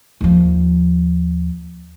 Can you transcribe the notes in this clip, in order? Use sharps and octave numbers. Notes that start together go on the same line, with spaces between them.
D#2 F3